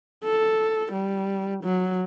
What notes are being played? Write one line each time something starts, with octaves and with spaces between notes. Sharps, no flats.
A4
G3
F#3